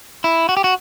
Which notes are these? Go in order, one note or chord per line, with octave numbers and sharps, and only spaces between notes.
E4
F#4
G4
F#4